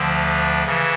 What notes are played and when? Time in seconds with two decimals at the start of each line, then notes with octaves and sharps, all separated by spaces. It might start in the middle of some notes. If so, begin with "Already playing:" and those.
Already playing: D2 D3 F3
0.63 C#3 E3